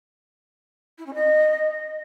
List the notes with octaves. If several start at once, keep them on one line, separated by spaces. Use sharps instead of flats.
E4
C#4
D#5